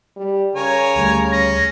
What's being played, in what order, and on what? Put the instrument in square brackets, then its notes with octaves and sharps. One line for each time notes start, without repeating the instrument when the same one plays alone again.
[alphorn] G3
[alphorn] C#3 [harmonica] A#4 C#5 G#5
[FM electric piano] D2 G3 A3
[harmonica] C#4 [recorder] A#6